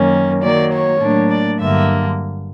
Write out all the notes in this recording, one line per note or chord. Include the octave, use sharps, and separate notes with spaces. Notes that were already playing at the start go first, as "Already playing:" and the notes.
Already playing: F#2 D#3 F#3 A#3 C#4
D#3 F#3 A#3 D5
C#5
A2 F#3 A#3 D4
D5
G2 D3 F#3 A#3 E5